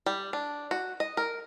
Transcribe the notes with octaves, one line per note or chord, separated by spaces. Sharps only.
G3
D4
F#4
D#5
A#4